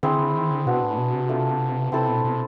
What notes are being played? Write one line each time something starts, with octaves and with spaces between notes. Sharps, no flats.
D3 C4 E4 G#4 C5
D3
D#3
D3
B2 B3 D4 F#4
A2
B2
C3
A3 D4 F4
C3 C4 E4 A4 C5
B2
B2